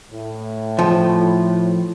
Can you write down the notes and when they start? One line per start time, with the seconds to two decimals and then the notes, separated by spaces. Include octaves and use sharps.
0.11 A2
0.79 F3